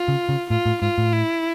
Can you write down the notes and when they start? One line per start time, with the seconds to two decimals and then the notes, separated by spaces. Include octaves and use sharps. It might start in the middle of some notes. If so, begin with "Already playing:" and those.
Already playing: F4
0.08 C#3
0.29 C#3
0.50 A2 F4
0.66 A2
0.81 G#2 F4
0.98 A2
1.13 E4